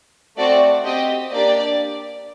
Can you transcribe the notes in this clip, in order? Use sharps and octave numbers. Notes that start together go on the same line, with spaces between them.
A3 C4 F#4 D5
C4 G4 D#5
A#3 D4 G4 D5